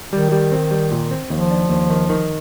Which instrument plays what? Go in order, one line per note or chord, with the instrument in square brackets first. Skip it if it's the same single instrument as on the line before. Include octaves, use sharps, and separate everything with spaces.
[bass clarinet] D#3 [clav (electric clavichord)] G3
[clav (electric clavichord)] G3
C4
G3
A#2
C4
[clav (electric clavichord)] D#2 [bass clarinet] F3
[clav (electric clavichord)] D4
D#2
D#3
D#3